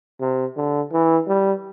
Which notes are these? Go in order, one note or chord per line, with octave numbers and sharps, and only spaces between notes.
C3
D3
E3
G3